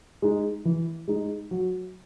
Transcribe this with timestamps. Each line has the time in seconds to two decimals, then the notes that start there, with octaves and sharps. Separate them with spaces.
0.22 G#3 D#4
0.65 E3
1.08 G#3 D#4
1.51 F#3